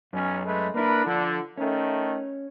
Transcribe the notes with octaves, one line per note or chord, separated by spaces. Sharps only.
B1 F#2 C#4
G#3 A3 B4
A#3 D4 E4 A#4 B4
D3 F3
D#3 A3 C#4